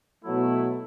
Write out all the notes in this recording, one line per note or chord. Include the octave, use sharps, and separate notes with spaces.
B2 F#3 A3 E4